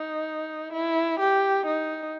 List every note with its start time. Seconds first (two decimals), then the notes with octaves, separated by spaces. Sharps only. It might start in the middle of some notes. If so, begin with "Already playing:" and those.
Already playing: D#4
0.73 E4
1.20 G4
1.66 D#4